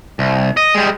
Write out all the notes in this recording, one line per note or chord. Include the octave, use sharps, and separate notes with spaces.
C2
D#5
G3 G#3